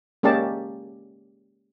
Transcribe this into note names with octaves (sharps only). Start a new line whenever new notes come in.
G#3 A#3 C#4 G4 D5 A5